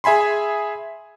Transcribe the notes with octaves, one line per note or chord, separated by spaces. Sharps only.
G#4 E5 G#5 B5 C6